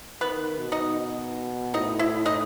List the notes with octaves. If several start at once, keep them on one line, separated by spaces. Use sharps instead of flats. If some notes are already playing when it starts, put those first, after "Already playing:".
D#3 B3 B4
B2
D#4 D#5
A2 D#4 D#5
E4 E5
D#4 D#5